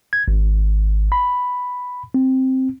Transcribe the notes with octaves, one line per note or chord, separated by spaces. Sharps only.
G#6
G#1
B5
C4